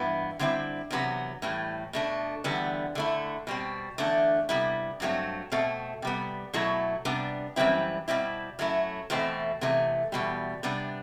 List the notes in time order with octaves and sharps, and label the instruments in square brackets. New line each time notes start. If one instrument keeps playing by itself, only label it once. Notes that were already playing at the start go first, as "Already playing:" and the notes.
Already playing: [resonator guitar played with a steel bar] G2 E3 B3
D3 G3 C4 E4
E2 C3 F#3 B3
A2 E3 G3
B2 A3 D4
E2 D3 G3 B3
D3 A3 E4
B2 G3 C4
E2 D3 A3 D4
C3 G3 B3 E4
G2 F#3 A3 C4
B2 A3 C4
C3 G3 B3
B2 F#3 A3 E4
C3 G3 B3 D4
F#2 E3 G3 C4 E4
B2 G3 C4 E4
F#2 F#3 A3 E4
E2 B2 A3 C4 E4
E2 C3 E3 A3
E2 B2 G3
C3 G3 B3 D4